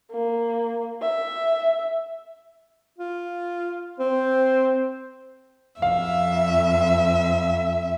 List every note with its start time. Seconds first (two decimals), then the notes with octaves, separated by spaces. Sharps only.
0.12 A#3
1.02 E5
2.98 F4
4.00 C4 C5
5.82 F2 E5 F5